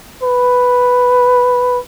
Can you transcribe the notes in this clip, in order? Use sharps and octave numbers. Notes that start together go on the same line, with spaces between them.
B4